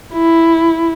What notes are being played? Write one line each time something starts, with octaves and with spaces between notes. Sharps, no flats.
E4